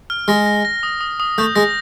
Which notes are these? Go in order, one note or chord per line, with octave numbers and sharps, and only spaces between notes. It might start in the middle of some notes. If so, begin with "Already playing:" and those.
F6
G#3 A#6
A#6
A#6
D#6
D#6
D#6
A3 G6
G#3 A#6